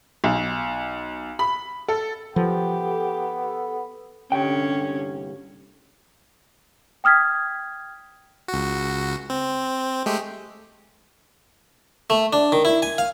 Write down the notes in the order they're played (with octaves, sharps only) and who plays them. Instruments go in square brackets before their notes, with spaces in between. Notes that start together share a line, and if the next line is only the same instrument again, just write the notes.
[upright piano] B1
B5
A4
[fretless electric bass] F3 [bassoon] B3 [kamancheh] G4 [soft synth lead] A4
[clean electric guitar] C2 G2 G5 [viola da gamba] D3 C#4
[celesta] G5 D#6 F6 G#6 B6
[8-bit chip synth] C#2 F#4
C4
G#3 A3 G4
[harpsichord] A3
D4
D#3
E4
G#5
F5